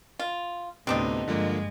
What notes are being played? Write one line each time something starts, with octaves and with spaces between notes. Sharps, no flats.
F4
D2 A2 C3 B3 C4 D4 D#4 G4
G2 D3 F3 G#3 A#3